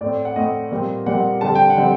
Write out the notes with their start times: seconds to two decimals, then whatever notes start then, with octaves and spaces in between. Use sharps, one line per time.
0.01 A2 A3 C4 D5
0.25 F#5
0.36 A2 A3 C4 D#5
0.71 A#2 G3 C4
1.06 A#2 G3 C4 F#5
1.41 D3 G3 C4 A5
1.55 G5
1.70 F#5
1.77 D3 G3 C4